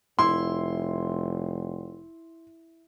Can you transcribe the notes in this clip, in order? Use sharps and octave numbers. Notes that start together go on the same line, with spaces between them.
F1 E4 C6